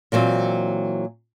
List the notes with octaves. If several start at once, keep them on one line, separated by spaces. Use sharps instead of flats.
A#2 E3 F#3 C4